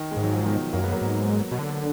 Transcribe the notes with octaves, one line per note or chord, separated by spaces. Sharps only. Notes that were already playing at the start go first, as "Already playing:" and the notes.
Already playing: D#3
G#3
G#2
F#3
F3
B2 D#3
F#2 F#3 A#3
G#3 B3
F#3 A#3
G#2
B2
D3